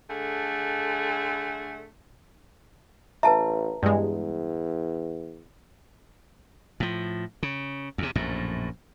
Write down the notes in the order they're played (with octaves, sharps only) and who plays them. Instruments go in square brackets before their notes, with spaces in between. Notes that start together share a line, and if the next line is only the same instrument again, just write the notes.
[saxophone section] D3 A3 G#4
[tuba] A1 [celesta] B4 A#5 [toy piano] E5 A5
[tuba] E2 [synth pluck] G2 G#3
[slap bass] A2 F3
C#3
E2 C3
A#1 F#2 A2